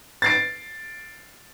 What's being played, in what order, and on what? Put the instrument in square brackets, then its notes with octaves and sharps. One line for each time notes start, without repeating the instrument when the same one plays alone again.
[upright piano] A6 C7 D7